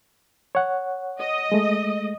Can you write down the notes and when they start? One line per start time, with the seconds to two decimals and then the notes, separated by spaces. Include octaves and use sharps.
0.55 C#5 F#5
1.20 D#5
1.52 G#3 A3